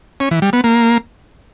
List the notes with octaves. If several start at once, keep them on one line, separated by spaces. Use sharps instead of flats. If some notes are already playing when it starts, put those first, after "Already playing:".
C#4
E3
G3
B3
A#3